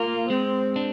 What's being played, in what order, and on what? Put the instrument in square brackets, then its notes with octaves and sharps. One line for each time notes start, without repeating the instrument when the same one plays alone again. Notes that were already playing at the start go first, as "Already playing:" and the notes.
Already playing: [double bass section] A#3 [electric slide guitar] F4
[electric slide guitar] G#3 [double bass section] C4
[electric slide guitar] D4